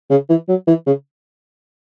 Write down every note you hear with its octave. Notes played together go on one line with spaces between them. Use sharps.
C#3
E3
F#3
E3
C#3